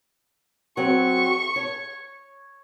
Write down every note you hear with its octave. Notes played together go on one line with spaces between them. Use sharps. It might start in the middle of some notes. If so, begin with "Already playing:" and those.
F#3 C4 C#6
C#5